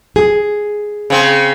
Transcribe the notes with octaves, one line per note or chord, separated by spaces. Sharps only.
G#4
C#3 C4